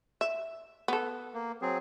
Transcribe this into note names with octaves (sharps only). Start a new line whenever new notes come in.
E5
B3 A4
A#3
F#3 C4 G#4